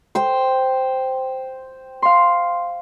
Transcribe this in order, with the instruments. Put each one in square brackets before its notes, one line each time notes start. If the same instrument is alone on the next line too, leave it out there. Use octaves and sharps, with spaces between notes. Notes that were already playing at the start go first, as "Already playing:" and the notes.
[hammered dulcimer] C5 G5
[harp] F5 C6